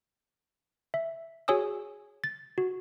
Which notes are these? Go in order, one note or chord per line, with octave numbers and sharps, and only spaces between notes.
E5
F#4 G#4 C#5 G#5 D#6 E6
A6
F#4